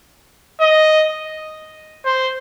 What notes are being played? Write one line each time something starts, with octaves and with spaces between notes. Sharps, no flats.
D#5
C5